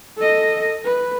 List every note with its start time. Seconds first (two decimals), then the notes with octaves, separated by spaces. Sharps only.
0.17 A4 D#5
0.85 B4